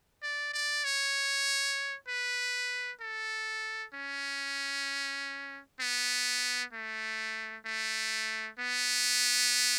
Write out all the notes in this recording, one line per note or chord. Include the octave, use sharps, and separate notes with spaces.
D5
D5
C#5
B4
A4
C#4
B3
A3
A3
B3